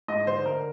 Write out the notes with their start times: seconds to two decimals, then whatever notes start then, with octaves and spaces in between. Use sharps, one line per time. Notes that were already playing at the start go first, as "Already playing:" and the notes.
0.08 G#2 D#5
0.27 D3 C5
0.46 D3 A#4